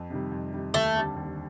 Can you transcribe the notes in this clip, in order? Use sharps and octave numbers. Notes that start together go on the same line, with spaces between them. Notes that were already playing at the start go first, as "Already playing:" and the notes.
Already playing: F2
C3 D#3 G3
F2
C3 D#3 G3
D#2 A3
D3 G3 C4 G4
D#2